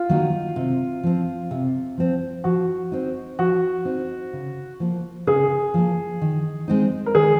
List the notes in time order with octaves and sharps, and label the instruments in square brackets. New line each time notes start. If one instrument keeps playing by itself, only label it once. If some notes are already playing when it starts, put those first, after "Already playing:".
Already playing: [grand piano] F4
[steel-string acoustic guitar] D#3 F#3 A#3 D#4
C3
F3 C4
C3
F3 C4
[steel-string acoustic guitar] F3 [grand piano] F#4
[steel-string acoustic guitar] C4 D#4
[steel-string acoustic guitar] F3 [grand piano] F#4
[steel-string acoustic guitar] C4 D#4
C#3
F3 A#3
[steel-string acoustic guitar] C#3 [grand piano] G#4
[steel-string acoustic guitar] F3 A#3
D#3
G#3 C4 D#4
[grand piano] A#4
[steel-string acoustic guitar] D#3 [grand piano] G#4